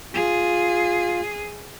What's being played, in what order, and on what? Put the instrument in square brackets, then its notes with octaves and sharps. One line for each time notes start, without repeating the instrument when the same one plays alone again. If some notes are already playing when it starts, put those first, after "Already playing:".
[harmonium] F4 [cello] G#4